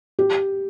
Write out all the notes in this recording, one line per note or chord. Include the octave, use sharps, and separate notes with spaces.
G4